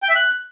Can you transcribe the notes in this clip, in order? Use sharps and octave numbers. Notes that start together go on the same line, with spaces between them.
G5
E5
F#6